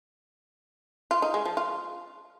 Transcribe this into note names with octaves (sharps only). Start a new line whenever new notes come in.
F4
D#4
G#3
F3
F4